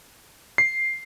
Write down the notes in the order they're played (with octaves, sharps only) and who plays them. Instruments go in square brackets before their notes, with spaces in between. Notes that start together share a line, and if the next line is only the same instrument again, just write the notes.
[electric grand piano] C7